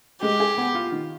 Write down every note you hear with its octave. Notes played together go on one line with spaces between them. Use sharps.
G#3 G4
G#4
B3
F4
D#3